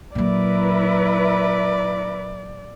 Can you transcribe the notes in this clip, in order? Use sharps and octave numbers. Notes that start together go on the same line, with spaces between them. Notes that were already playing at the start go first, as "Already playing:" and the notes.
A#2 F#3 E4 A#4 B4 D5